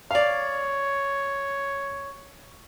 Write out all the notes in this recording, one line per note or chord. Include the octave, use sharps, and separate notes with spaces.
C#5 D5 F5